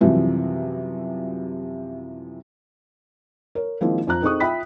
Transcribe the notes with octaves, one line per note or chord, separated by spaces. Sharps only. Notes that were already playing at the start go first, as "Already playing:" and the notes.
F#2 C3 E3 F3 G3
A#4 C#5
D#3 F3 G#3 A#3 C4 E4
F2 F4 A#5 F#6
C4 D#4 G#4 A4 C#6 D#6
F4 E5 G5 B5 B6